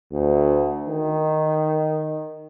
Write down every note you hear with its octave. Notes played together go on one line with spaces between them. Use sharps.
D2
D#3